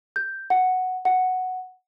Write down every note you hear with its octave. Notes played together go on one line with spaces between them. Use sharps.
G6
F#5
F#5